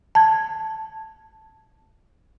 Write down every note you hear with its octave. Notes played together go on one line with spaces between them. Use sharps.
A5 G#6